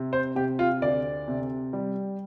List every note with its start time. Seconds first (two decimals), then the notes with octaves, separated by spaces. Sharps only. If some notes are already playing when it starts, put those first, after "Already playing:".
Already playing: C3
0.13 C5
0.35 C3 G4
0.59 F4
0.82 D2 D5
1.28 C3
1.73 G3